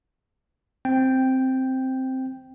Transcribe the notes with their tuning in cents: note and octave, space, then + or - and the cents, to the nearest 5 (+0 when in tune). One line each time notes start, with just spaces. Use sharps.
C4 +0 G5 +0